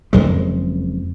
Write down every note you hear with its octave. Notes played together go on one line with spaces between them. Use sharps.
F#1 F2 G#3